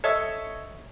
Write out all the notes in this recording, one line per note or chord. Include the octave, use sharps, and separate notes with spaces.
A4 C#5 D#5 E5 D#6 E6